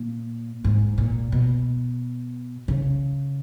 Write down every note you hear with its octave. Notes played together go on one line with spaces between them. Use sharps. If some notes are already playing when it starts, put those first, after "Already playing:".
Already playing: A#2
G#2
A#2
B2
C#3